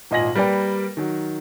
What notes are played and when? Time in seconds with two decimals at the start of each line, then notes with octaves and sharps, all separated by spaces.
0.11 G#1 A#2 D#5 G#5 A#6 F#7
0.35 G3 A#3 A#4 B4 D5 G5
0.97 D#3 F#3